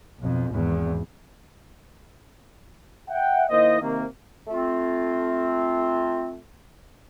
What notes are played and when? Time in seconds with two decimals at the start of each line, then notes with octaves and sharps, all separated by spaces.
0.18 B1 F2
0.49 G#1 E2
3.09 E5 F#5 G5
3.50 D#3 A#3 E4 C5 D#5
3.81 C3 D#3 A#3
4.47 A3 C4 F4